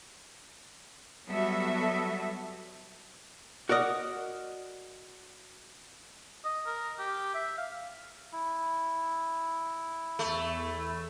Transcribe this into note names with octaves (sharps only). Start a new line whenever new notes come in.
F#3 G3 B3 F#4 A4 E5
F#4 A#4 D5 D#5
D#5
A#4
G4
E5
F5
E4
E2 A3